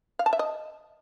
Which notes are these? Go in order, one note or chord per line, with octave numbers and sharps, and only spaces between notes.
F5
A5
E5
D#5